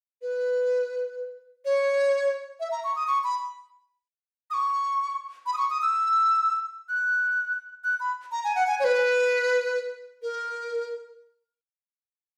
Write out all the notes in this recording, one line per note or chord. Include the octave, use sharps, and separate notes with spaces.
B4
C#5
E5
A#5
C#6
D#6
C#6
B5
D#6
C#6
B5
D#6
C#6
D#6
E6
F#6
F#6
B5
A#5
G#5
F#5
G#5
C#5
B4
A#4